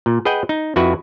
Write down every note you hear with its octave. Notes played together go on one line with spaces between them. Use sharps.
A#2
G#4 B4 D#5 F#5 G5
D#4
F2 E4 F#4 B4